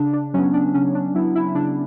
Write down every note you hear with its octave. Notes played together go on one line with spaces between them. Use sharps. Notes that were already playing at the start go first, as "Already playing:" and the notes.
Already playing: C#3 D4
D4
F#3 B3 C#4
D4
C#3 C#4
D4
F#3 B3 E4
E4
C#3 D4